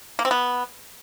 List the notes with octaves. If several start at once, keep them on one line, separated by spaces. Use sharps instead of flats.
A#3
C4
B3